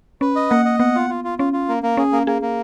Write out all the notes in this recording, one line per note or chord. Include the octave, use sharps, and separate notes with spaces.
C#4 B4
D#5
A#3 F#5
D#5
B3 F#5
F4
F4
F4
C#4 F4
F4
A#3
A#3
C#4 G#4
A#3
A#3 G#4
A#3